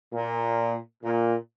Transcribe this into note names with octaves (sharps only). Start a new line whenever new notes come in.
A#2
A#2